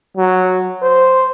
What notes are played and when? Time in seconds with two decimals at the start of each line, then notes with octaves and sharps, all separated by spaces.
0.17 F#3
0.82 C5